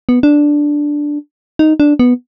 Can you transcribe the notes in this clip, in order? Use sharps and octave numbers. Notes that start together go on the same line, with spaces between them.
B3
D4
D#4
D4
B3